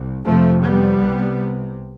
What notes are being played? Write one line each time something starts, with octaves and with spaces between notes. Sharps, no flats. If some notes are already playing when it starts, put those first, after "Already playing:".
Already playing: C2
F2 C3 F3 A3
G3 B3
C2 C3